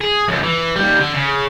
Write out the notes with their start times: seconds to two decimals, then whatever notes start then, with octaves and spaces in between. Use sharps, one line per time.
0.01 G#4
0.28 C#2 F#2
0.43 E3
0.76 D#2 G3
1.00 D3
1.14 C#3